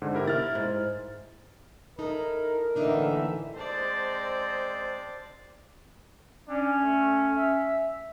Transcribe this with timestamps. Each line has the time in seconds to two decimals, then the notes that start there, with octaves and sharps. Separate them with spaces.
0.02 G#2 D3
0.15 E4 G4 A#4
0.27 E4 F6 A6
0.55 G#2
1.99 D#4 E4 A4 A#4
2.75 A2 D3 E3 A#3 D4 D#4 A4 E5
3.55 G#3 C4 C5 D5 A5
6.48 C#4 D4
6.82 A3
7.34 E5